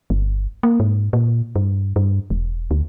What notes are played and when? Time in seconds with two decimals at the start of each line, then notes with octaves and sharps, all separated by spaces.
0.10 G1
0.63 A#3
0.80 G#2
1.13 A#2
1.56 G2
1.96 G2
2.30 E1
2.71 D2